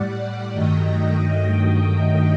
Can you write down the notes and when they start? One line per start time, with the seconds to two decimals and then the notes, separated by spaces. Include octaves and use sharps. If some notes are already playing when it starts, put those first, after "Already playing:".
Already playing: A2 G3 D5 F#5
0.52 G2 D#3 F#3 A3 D#5 G5